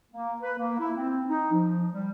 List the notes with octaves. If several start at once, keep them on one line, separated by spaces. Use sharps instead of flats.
A#3
B4
A#3
E4
C4
D#4
F3
G3